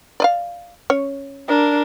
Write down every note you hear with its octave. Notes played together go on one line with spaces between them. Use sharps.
D5 D#5 F5
C#4 C#5
D4 A#4